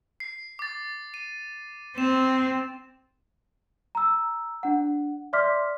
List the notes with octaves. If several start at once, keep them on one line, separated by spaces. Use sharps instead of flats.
C7
D6 A6
D#7
C4 E7
A#5 E6
D4 F#5
D5 E5 C6 D6 F6 B6